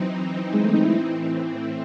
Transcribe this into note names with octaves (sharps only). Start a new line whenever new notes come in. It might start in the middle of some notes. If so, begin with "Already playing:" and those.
Already playing: E3 F#3 C4 D#4
G#3
A3
D#4
E4
A2 E3 C4